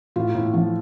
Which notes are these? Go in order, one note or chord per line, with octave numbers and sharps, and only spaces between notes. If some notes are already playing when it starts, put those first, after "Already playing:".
A2 F4
A2
F3